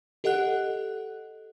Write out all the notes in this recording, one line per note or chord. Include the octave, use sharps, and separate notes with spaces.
G4 A4 D#5 F#5 F#6